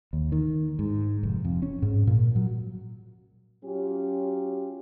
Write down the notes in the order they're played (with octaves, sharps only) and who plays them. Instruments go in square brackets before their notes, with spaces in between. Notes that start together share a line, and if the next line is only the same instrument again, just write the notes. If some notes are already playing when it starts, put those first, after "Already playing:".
[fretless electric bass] D#2
D#3
G#2
F1
F2
C#4
G#2
A#2
F#3
[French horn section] F#3 C#4 F4 G4